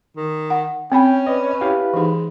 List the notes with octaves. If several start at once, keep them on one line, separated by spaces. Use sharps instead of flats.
D#3
F#5
C4 C#4 G5 G#5 B5
B4 D5 D#5
E4 G4 F5
E3 G#3 D#4